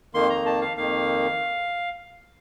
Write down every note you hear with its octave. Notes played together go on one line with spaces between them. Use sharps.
F2 D#3 A#3 C6
A#5
A5
F5
F2 D#3 A#3 F5